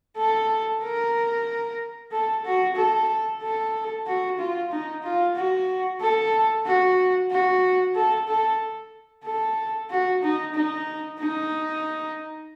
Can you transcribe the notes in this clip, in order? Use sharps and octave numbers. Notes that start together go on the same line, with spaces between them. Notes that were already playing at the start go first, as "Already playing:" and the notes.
A4
A#4
A4
F#4
A4
A4
F#4
F4
D#4
F4
F#4
A4
F#4
F#4
A4
A4
A4
F#4
D#4
D#4
D#4